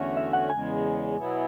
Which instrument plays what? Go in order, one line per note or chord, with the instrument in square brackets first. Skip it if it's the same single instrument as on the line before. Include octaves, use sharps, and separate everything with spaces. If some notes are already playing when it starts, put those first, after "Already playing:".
Already playing: [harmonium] E2 D3 A3 C#4 F#4
[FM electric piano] E5
F#5
[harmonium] E2 C#3 G#3 [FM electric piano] G#5
[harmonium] B2 F#3 B3 E4